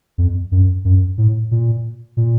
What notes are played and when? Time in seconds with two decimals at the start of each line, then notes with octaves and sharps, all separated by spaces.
0.18 F2
0.52 F#2
0.85 F#2
1.18 A2
1.51 A#2
2.17 A#2